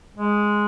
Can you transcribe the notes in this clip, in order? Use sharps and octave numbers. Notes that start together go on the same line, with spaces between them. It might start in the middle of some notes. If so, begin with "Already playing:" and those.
G#3